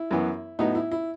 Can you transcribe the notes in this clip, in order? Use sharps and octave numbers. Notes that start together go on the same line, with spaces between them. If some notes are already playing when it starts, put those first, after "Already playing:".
Already playing: E4
F#2 E3 B3
A2 F#3 B3 D#4
E4
E4